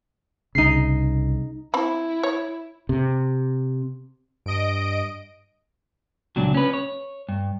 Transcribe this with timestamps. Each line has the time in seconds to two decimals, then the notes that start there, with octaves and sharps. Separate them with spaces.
0.55 C2 C#3 D#4 C7
1.74 C4 E4 B5
2.23 C#5
2.89 C3
4.46 G2 D#5 D7
6.36 C#2 A#2 F#3 D4
6.54 C#4 B4
6.74 C#5
7.29 G2